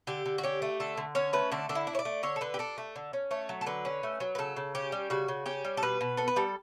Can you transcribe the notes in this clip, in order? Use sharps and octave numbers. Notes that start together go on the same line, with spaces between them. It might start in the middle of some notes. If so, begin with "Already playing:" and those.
D3 G4
D3
F#4
C#4 G4
A3
D3 A4
D3
C#4 C#5
A3 B4
D3 D4
D3 D4
E4
D4
C#5
D5
A3
D3 C#5
A4
D3 B4
G4
D4 A4
A3
D3
C#4
A3 C#5
F#3
A4
D3 B4
C#4
A3
F#3
B4
C#3 A4
C#3
C#4 G4
G3
C#3 F#4
C#3
C#4 G4
G3
A4
B2 B4
B2
B3 A4
B4
G3 A4